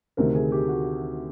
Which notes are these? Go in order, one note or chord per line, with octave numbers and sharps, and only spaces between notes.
D2 C3 D#3 A#4
G#4
G4
F#4